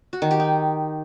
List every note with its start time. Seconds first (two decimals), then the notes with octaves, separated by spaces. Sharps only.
0.13 F#4
0.22 D#3
0.31 G4
0.40 D#4